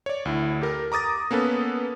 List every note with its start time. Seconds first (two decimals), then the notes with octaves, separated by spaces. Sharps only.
0.06 C#5 D5
0.25 D2 E4
0.61 G4 A4 A#4
0.92 A#5 D6 D#6 A6 A#6
1.31 A#3 B3 C#4 A4 B4